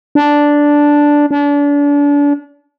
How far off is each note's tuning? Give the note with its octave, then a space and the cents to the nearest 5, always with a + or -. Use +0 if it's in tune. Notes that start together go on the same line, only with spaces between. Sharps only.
D4 -5
D4 -35